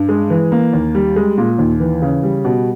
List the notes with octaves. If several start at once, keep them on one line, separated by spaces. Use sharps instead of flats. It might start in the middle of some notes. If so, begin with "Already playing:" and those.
Already playing: G2
G#3
E3
A#3
D#2
G3
G#3
A#2
D#2
E3
C#3
G3
B2